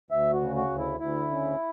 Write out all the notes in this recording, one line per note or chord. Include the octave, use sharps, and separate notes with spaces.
D2 E5
F#4
C#3
F#4
D2
E4
D2 E4
C#3